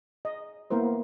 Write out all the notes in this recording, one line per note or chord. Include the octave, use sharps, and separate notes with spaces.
D#5
A#3 B3 E4 A#4 C5